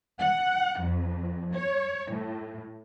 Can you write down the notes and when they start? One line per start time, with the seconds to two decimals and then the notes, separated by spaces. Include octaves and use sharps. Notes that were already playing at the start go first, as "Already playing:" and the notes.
0.19 F#5
0.80 F2
1.54 C#5
2.11 A2